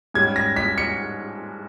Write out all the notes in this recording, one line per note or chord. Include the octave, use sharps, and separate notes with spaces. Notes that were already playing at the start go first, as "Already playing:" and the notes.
G#2 G3 C#4 G#6
A#6
B6
C#7